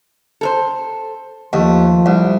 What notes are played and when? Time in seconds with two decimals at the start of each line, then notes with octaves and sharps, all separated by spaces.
0.41 A4 A#4 C5
1.53 D#2 F3 A3
2.06 C2